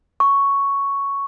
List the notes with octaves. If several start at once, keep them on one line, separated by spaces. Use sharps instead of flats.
C#6